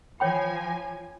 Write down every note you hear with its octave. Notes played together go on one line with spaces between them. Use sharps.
F3 C#5 G5 G#5 B5